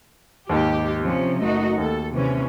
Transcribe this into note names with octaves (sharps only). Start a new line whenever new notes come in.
D#2 G#2 G4
C3 F3 C#4
F#1 A3 D#4 F#4
D#2 A4
C3 E3 C#4